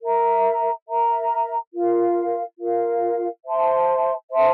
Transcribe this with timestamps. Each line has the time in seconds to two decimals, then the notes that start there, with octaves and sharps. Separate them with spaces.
0.02 A#4 E5 A#5
0.87 A#4 E5 A#5
1.73 F4 A#4 F5
2.59 F4 A#4 F5
3.45 C5 E5 A5 C6
4.31 C5 E5 A5 C6